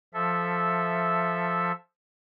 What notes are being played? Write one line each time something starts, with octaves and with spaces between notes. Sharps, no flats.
F3 A4 E5